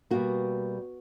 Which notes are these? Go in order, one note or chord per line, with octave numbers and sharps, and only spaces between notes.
B2 G3 A#3 F#4